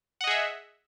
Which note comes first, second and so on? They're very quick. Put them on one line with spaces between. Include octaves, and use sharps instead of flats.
F#5 D#5 G#4 E5